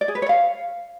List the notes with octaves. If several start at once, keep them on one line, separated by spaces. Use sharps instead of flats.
D5
G#4
B4
C#5
F5